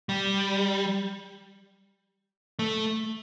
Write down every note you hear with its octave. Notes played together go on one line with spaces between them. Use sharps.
G3
A3